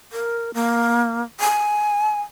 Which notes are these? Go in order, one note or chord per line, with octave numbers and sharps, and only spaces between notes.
A#4
A#3
G#5